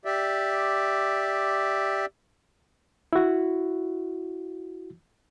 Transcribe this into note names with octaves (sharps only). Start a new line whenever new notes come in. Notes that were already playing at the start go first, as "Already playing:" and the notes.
G4 D5 E5
E4 F#4